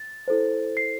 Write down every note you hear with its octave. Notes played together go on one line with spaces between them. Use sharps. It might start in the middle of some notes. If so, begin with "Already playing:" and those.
Already playing: A6
E4 A4 C5
C7